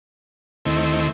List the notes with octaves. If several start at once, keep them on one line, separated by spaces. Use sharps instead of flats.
D#2 D#3 A3 C4 E4